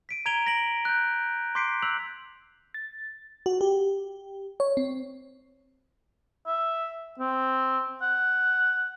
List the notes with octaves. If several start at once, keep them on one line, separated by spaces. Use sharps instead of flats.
B6 D7 D#7
A#5 G#6 D7 D#7 F7 G7
A#6 B6 D7 F#7
F#6 G6
C6 D6 G6 B6 C7 D7
E6 F#6 B6 F7 F#7
A6
F#4
G4
C#5
C4
E5
C4
F#5